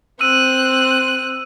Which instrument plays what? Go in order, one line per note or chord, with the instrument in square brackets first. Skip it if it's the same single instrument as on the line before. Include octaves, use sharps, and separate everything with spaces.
[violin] C4 F#6 [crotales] E6 D#7